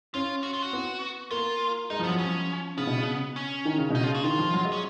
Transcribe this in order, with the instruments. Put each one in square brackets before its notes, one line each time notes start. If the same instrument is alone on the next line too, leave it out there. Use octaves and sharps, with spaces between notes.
[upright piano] C#4 [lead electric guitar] F4
[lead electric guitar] F#4
F4
F#4
[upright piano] B3
[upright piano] A#3 [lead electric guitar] F4
[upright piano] G#3 [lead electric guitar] D#4
[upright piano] F3
[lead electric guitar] B3
[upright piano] F#3
[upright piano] F3 [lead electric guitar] C#4
[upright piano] C#3 [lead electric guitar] B3
[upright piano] B2
C#3
[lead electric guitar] C#4
[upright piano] D#3
C#3
[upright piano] B2 [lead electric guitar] D#4
[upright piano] C#3 [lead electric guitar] F4
[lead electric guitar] F#4
[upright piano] D#3 [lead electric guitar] F4
[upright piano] F3
F#3
G#3
[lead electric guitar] C#4